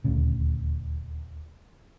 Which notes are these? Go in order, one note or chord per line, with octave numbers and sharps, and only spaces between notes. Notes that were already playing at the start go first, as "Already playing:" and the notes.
D#1 D2 C#3